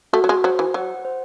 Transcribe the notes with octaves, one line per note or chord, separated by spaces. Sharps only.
A3 F#4
F#3
G#3
F#3 C5
E3
F#3 F#5
C5